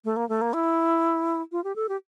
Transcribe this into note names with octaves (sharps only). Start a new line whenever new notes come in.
A3
A#3
A3
A#3
E4
F4
G4
A4
G4